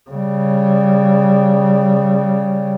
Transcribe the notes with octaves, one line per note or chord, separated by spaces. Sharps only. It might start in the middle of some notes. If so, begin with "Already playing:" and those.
C#3 G3